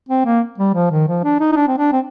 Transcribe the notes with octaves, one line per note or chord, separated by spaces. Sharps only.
C4
A#3
G3
F3
D#3
F3
D4
D#4
D#4
D4
C4
D4
C4